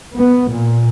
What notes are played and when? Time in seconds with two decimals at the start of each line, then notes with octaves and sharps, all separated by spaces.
0.15 B3
0.50 A#2